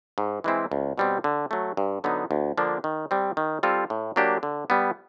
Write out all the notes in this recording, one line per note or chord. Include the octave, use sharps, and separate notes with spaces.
G#2
E3 G#3 C4 E4
C#2
B2 G3 C4
D3
F#3 A3
G2
D3 F#3 B3 D#4
D2
D3 F3 A#3 D4
D#3
G3 C4
D#3
G3 C4 F4 A4
A2
F#3 A#3 D4 G4
D3
G3 B3